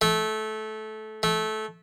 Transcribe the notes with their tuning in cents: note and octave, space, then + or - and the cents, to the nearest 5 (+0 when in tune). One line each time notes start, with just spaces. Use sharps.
A3 -20
A3 -20